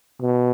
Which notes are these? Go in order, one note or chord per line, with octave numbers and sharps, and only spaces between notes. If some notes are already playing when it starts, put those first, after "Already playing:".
B2